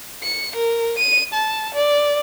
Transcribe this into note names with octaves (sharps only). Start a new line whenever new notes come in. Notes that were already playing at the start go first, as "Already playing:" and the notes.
C#7
A#4
D#7
A5
D5